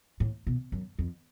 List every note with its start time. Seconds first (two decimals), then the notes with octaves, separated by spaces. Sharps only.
0.20 A2
0.47 B2
0.72 F#2
0.99 F2